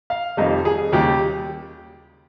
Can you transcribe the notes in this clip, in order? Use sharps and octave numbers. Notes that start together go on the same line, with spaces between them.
F5
F1 F2 D#3 G3 D#5
G#4
D#2 C#3 G3 G4